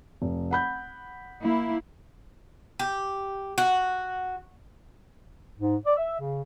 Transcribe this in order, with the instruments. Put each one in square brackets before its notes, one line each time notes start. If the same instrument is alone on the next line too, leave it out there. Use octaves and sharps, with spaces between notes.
[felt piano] F1
F#5 B5 G6
[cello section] A#3 E4
[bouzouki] G4
F#4
[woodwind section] G#2
D5
E5
C#3